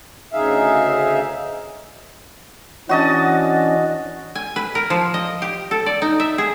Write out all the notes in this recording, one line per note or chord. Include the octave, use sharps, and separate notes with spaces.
D2 C#3 D#4 G#4 E5 F5
E3 C#4 D4 F#4 D#5 A5
G#5
B4
A#4
F3
D#5
G4
A4
D5
D#4
E5
G#4